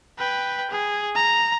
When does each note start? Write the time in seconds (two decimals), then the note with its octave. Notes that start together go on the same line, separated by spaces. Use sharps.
0.19 B4 G5
0.71 G#4
1.16 A#5